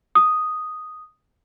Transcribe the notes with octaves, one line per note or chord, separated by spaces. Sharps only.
D#6